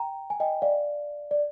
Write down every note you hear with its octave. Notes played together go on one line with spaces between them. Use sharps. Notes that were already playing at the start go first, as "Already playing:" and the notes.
Already playing: G5 A#5
G#5
D#5 G5
D5 F5
D5